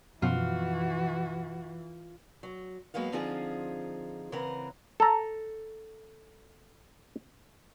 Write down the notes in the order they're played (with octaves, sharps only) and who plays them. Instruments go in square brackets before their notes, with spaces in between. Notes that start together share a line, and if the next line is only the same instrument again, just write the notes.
[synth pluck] F#2 B2 F3 [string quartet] E3 [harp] F4 [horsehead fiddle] F#4
[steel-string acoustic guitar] F#3
F#3 G#3 A#3 B3 F5
D3 F3 C4 D#4 F4 G#4
C#3 E3 C4 A#4 F#5 A#5
[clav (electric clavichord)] A4 A#5